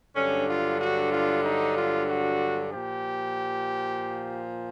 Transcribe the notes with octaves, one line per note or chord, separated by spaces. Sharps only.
G2 D3 F#3 C#4
F4
F#4
F4
D#4
F4
F#4
A#2 F3 G4